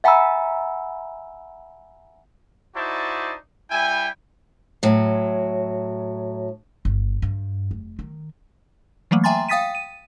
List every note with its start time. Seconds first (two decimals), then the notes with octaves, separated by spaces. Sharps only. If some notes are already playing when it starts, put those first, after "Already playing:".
0.04 E5 F#5 G#5 A#5 B5 E6
2.75 D#4 E4 F#4 C5 D5 A5
3.70 G3 E4 E5 G5 G#5
4.83 A2 F#3
6.85 G1
7.22 G2
7.71 F1
7.99 D#3
9.11 E3 F#3 A3 A#3
9.24 E5 G5 G#5 A#5 C6 A6
9.49 F5 G5 D#6 A6 B6 D#7
9.75 D#7